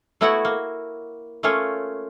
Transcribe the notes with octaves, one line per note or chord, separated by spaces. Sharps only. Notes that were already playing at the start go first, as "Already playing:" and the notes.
A3 B3 E4 F#4 C#5 F#5
A#3
A3 A#3 C#4 F4 C#5